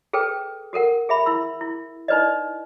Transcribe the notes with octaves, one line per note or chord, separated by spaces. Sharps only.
G#4 A4 B4 G5
F#4 A4 A#4 F#5
G#4 E5 B5
E4 C6 E6
E4
D#4 E4 B4 D5 D#5